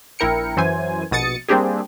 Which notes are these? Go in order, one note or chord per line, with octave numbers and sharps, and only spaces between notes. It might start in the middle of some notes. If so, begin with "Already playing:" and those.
A#1 E4 A#4 G5 C#7
F#2 E3 C5 G#5
A#1 B2 D#6 A6 C#7
G3 A#3 C4 D4 G4 G#4